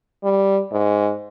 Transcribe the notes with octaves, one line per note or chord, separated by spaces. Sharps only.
G3
G#2